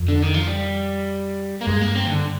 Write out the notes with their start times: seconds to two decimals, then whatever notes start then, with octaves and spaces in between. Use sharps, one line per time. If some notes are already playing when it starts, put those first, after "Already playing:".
Already playing: F2
0.08 D3
0.22 D#3
0.34 F3
0.47 G3
1.61 A#3
1.67 G2 G#3
1.82 A#3
1.96 C4
2.06 D#3
2.10 D3